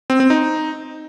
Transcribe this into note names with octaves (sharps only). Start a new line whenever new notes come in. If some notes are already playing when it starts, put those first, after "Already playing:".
C4
C4
D#4